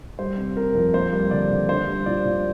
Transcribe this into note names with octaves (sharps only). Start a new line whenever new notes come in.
G3 C5
C3
C4 A#4
F2
A#3 C5
G3
D3 D5
D3
D4 C5
G3
A#2 D5
A#2